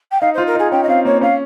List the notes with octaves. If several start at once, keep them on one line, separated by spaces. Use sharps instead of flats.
G5
D#4 F5
C5
F4
A#4
D#4 G#4
C#4 G5
D#5
C4 F5
A#3 C#5
C#4 F5